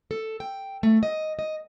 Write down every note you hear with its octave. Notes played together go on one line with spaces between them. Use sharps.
A4
G5
A3
D#5
D#5